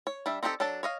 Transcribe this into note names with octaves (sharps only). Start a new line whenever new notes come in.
C#5
G3 D4 E5
C4 D#4 E4 G4 A4
F#3 D4 A4 A5
C#5 D#5 F5